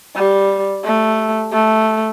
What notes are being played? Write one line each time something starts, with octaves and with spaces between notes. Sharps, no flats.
G3
A3
A3